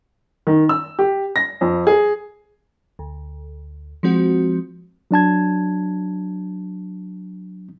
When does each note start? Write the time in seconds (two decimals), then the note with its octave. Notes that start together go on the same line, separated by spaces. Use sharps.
0.47 D#3
0.69 E6
0.99 G4
1.36 A#6
1.61 F2
1.87 G#4
2.99 D2
4.03 F3 G#3 C4 F#4
5.11 F#3 D4 A5 G#6